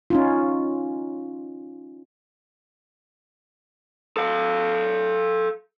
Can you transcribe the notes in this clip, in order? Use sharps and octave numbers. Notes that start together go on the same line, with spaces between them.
C#4 D#4 F4
A4 F5